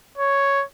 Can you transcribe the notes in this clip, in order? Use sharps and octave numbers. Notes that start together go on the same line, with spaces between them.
C#5